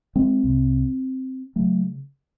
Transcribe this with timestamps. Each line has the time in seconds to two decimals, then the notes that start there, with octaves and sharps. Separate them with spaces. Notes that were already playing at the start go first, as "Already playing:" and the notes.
0.16 G#3 C4
0.44 C2 C3
1.56 C#3 F#3 A3